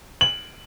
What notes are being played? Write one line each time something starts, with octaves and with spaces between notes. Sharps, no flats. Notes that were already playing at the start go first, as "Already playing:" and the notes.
F#7